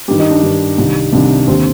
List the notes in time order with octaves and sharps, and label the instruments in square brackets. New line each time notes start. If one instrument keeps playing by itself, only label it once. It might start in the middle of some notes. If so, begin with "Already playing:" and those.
[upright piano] G2 D#3 G4
D#4
D4
G2 D#3
C2 C3 D#3
C2 C3 D#3 D4
D#2 D3 C4